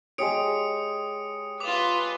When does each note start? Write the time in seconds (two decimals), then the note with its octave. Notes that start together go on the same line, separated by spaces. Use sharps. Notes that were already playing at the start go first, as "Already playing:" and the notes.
0.18 G#3 G4 C#5 D#6 C#7 D7
1.60 F4 B4 D6 F7